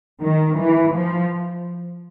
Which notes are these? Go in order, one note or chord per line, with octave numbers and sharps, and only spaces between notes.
D#3
E3
F3